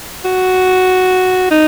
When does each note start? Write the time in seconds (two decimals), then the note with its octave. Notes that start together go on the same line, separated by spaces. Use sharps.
0.25 F#4
1.51 D#4